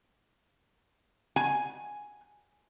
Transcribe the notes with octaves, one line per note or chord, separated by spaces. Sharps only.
G#5